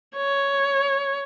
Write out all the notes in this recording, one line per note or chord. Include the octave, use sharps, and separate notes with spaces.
C#5